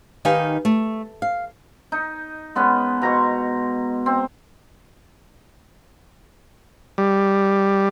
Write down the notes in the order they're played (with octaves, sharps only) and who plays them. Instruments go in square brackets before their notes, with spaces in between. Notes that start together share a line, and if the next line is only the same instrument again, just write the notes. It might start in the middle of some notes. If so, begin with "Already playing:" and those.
[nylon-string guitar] D#3 D#4 G4 B4 F5 G#5
A3
F5
[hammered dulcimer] D#4
G#3 B3 C#4
B2 A#5 C6 C#6
C4
[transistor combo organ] G3